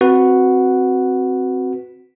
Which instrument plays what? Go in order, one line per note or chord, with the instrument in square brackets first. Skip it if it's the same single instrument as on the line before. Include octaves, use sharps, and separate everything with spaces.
[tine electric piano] C4 F#4 B4 F#5